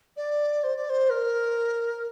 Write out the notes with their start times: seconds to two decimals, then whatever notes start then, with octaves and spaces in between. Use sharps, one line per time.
0.16 D5
0.63 C5
0.76 D5
0.89 C5
1.09 A#4